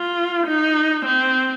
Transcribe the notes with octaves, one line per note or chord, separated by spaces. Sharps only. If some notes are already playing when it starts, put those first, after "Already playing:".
Already playing: F4
D#4
C4